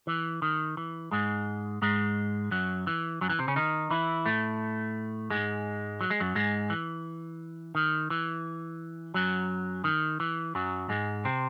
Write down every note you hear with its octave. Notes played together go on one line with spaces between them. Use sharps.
E3
D#3
E3
G#2 G#3
G#2 G#3
F#2 F#3
E3
F#2 F#3
E3
C3 C4
C#3 C#4
D#3 D#4
E3 E4
A2 A3
G#2 G#3
F#3
G#3
F#2 F#3
G#2 G#3
E3
D#3
E3
F#2 F#3
D#3
E3
F#2 F#3
G#2 G#3
C3 C4